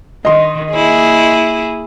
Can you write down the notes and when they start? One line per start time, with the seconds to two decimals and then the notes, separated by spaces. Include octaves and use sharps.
0.25 D#3 D#5 C6
0.73 A#3 E4 G#4